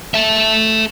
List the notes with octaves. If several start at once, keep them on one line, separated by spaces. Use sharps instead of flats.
A4 E5